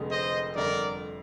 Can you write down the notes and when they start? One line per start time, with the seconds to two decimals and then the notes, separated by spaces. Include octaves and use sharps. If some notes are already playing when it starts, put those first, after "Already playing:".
Already playing: F1 F2 D3 G#3
0.10 C5 D#5
0.55 G1 F2 D3 A#4 D5